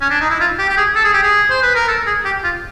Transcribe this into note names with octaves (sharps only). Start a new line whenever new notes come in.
C#4
D4
D#4
E4
F4
G4
G4
G#4
A4
G#4
G4
G#4
C5
B4
A#4
A4
G#4
G4
F4